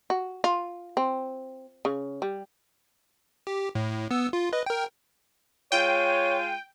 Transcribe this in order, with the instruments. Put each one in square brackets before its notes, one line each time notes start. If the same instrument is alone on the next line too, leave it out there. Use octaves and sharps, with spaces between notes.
[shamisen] F#4
F4
C4
C#3
G3
[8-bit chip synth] G4
A2
B3 E6
F4
B4 D#5
A#4 G5
[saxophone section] G#3 F4 [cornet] C#5 [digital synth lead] G5 [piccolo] D#7